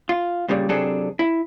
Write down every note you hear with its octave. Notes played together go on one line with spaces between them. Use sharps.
F4
G2 A#2 C#3 G3
C3 F#3 C4 D4 G#4 A4
E4